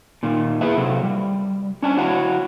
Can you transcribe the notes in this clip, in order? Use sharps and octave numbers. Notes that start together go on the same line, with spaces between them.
A#2 D#3
E4 G#4 B4 E5
C3 F#3 A4
G3
C#4 D4 G#5
E4 F#4 C#5 F#5